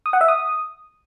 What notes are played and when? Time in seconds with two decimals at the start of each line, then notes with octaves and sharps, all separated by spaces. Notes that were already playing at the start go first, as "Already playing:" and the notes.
0.06 D#6
0.13 F#5
0.21 E5
0.28 D#6